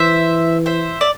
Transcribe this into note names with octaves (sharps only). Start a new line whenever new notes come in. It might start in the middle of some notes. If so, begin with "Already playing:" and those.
Already playing: E3 C5 E5
C5 E5
D5